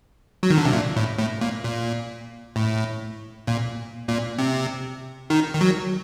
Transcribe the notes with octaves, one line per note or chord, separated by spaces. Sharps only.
F#3
D#3
D3
C3
A#2
A2
A2
A#2
A#2
A2
A#2
A#2
C3
D#3
D#3
F#3